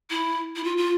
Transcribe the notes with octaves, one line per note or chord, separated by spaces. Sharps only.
E4
E4
F4
F4